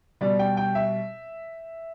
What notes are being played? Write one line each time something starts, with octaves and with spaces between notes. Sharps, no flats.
B2 G3 D5
G5
G5
E5